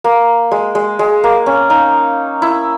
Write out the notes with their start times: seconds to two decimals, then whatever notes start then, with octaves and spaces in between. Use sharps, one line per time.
0.04 A#3
0.51 G#3
0.75 G#3
0.99 G#3
1.24 A#3
1.46 C#4
1.70 D#4
2.42 E4